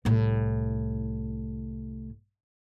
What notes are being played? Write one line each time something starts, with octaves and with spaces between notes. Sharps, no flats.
C2 A2